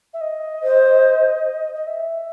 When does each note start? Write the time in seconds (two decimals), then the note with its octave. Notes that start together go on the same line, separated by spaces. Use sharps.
0.14 E5
0.21 D#5
0.63 C5
1.75 D#5
1.87 E5